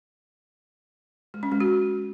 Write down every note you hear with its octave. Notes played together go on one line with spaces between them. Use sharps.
G#3
C#4
G#3
F#4